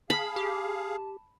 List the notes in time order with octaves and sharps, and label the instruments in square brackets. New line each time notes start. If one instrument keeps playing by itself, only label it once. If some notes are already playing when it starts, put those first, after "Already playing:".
[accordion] G#4 F5 [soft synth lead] A5 [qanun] B5
[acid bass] G4